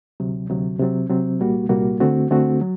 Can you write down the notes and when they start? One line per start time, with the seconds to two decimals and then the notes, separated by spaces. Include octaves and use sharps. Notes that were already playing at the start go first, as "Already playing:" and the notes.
0.20 D2 C3 F#3
0.49 D2 C3 F#3
0.79 C3 F#3 C4
1.10 C3 F#3 C4
1.39 C2 A#2 G3 A#3 F#4
1.69 C2 A#2 G3 A#3 F#4
2.00 D2 D3 A3 C4 F#4
2.30 D2 D3 A3 C4 F#4
2.61 F#3